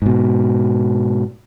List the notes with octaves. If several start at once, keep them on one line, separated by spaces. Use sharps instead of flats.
G#2 B2